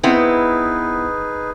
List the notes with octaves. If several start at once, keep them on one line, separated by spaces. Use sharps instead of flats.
B3 C4 D#4 E4 G#4 B4